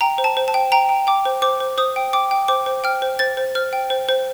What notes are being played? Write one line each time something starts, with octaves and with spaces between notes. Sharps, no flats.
G5 A#5
C5
A5
C5
A5
G5
G5 A#5
G5
G5 D6
C5
C5 D6
C5
C5 D#6
G5
G5 D6
G5
C5 D6
C5
G5 F6
C5
C5 A6
C5
C5 F6
G5
C5
C5